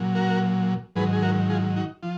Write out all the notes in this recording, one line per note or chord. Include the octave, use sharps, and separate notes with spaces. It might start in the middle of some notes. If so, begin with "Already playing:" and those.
Already playing: A#2 F#3
F#4 A#4
G#2 D#3 F#3 G#4 B4
G#4
F#4 A#4
F4 G#4
D#4 F#4
F3 F4